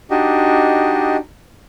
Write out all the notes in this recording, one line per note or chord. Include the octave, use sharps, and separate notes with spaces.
D4 D#4 F#4 G4 D#5